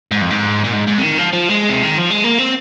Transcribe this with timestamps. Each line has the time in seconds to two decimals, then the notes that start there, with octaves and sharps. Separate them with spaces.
0.11 G#2
0.21 F2
0.30 G#2
0.64 A#2
0.73 G#2
0.87 G#2
0.98 C3
1.03 D#3
1.18 F3
1.33 F3
1.49 G#3
1.69 C3
1.83 D#3
1.97 F3
2.10 G#3
2.24 A#3
2.38 C4